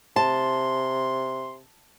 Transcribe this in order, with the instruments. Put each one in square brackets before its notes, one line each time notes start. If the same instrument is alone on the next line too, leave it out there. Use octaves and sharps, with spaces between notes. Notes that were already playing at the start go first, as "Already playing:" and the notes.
[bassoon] C3 [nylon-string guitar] A5 [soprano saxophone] C6